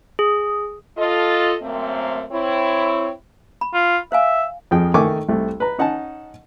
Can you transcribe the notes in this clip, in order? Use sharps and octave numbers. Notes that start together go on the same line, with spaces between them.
G#4
F4 A4 D#5
F#2 A3 A#3 C4
C4 E4 C#5
B5
F4
C5 E5 F5 G#5
F2 F3 G#4 G5
D#3 A3 A#4 G#5 C#6 D6
C2 A3
B4 A#5
C#4 D#4 F#5 G#5 A5